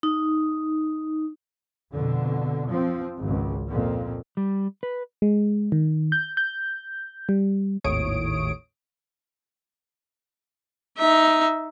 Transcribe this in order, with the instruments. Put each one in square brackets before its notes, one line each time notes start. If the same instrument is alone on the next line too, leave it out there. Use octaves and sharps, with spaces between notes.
[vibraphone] D#4
[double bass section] F2 B2 D3
F3 C4
G#1 C#2
F2 A#2
[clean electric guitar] G3
B4
[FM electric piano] G#3
D#3
G6
G6
G3
[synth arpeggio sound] G#1 D#2 A2 C#5 D#6 D7
[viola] D#4 E5